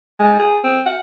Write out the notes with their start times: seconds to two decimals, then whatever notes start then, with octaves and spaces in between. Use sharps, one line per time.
0.19 G#3
0.39 G#4
0.64 C4
0.86 F#5